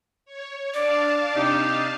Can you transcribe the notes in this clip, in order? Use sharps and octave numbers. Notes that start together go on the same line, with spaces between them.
C#5
D4 D5 F5 A5
C3 D#4 G4